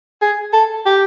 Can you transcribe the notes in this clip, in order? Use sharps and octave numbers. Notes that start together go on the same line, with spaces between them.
G#4
A4
G4